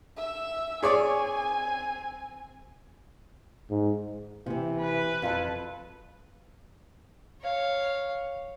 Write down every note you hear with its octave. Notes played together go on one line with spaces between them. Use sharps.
E5 E6
C4 G#4 C#5 D5 G#5
G#2
C3 E3 C4
B4
F2 F4 A5
C#5 F5